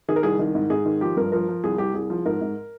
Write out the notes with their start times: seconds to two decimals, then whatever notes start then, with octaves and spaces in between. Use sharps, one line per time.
0.08 D#3 G#4
0.16 A#4
0.23 C2 G#4
0.39 D#3
0.55 G#2
0.70 G#2 G#4
0.85 D#3
1.01 F3 G4
1.17 G2 A#4
1.32 F3 A#4
1.48 F3
1.64 C2 G#4
1.78 C2 G4
1.94 C2 G#4
2.10 F3
2.25 G#2 A#4
2.41 G#2